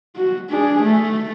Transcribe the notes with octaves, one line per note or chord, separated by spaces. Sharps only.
F#4
D4 G#4
A3